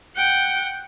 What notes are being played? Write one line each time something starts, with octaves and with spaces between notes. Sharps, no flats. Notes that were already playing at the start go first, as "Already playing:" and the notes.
F#5 G5